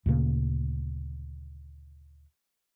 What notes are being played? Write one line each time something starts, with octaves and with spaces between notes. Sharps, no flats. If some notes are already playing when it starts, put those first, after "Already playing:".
D2 A#2 C#3 A#3